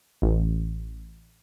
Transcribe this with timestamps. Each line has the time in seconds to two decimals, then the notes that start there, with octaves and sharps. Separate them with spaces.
0.22 A1